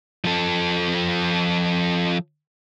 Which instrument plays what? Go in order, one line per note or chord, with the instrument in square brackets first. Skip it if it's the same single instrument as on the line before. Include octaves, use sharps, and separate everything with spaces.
[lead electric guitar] F3 A4